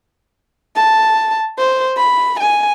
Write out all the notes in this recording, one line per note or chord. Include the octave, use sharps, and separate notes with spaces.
A5
C5
B5
G#5